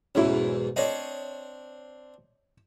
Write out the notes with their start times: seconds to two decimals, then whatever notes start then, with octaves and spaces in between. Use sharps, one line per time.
0.15 B1 E2 G#2 C#4 E4
0.76 C4 D4 C5 C#5 D#5